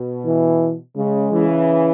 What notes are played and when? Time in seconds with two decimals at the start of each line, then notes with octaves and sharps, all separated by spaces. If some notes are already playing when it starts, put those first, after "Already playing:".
Already playing: B2
0.26 E3
0.96 C#3 G#3
1.31 C#3 E3